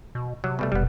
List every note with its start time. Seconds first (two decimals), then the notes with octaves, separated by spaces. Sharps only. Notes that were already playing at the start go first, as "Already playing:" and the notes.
0.15 B2
0.44 C3 F#3
0.59 B2 G3 A3
0.72 F1 B2 G3 B3